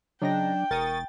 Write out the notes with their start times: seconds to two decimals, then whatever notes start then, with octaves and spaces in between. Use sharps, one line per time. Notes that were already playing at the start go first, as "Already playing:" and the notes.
0.22 C#3 F#3 D4 D#4 G5 A#6
0.71 E1 A#4 C#6 D#6 A6